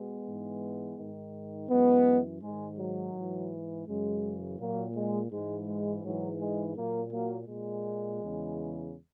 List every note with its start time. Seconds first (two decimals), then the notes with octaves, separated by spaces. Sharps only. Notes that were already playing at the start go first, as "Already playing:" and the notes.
Already playing: B2 G#3 B3
0.26 G#2 E3
0.98 G#2 D#3
1.70 F#2 E3 G#3 B3
2.42 G#2 D#3 G#3
2.79 F#3
3.14 G#2
3.19 E3
3.87 F#2 C#3 E3 G#3
4.60 A#2 F#3 A#3
4.95 G#3
5.31 G#2 E3 G#3
5.67 G#3
6.04 G#2 E3 F#3
6.41 G#3
6.77 A#2 F#3 A#3
7.12 F#3 A#3
7.48 A#2 G#3
8.22 E2 C#3 E3